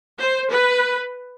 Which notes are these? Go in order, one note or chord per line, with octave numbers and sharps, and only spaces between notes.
C5
B4